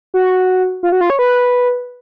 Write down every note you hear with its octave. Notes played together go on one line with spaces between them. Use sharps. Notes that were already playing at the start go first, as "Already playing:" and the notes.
F#4
F4
F#4
F4
C#5
B4